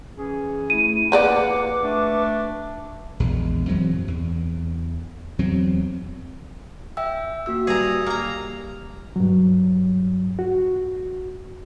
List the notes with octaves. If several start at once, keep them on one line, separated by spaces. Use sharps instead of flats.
E3 C#4 G#4
A3 E4 D#7
F3 A#3 G#4 B4 D5 F#5 D6
A3 D4
A#1 E2 G#3
F#2 E3 F#3 C4
E2
E2 F#3 C4
E5 G5 E6
A#3 F#4 E6
G2 G#4 A#5
A#3 A#5
G2 F#3
F#4